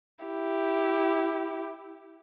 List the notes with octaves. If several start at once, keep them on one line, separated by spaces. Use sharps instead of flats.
E4 G4